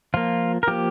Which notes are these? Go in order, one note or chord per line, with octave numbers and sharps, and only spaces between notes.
F3 A#3 F4
A#4
F3 A#3 G4